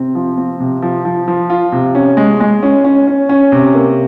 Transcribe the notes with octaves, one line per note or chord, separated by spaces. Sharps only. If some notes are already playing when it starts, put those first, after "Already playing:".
Already playing: C3 C4
F3
C4
C3
F3
F3
F3
F4
C3
C#4
G#3
G#3
C#4
C#4
C#4
C#4
C3
A#3